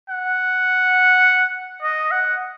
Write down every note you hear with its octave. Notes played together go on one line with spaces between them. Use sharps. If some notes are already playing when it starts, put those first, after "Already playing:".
F#5
D#5
F#5